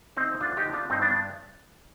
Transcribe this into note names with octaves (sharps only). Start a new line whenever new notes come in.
D2 C4 D#4
D2 D4 F4
D#4 G4
D3
D4 F4
G2 C4 D#4
B3 D4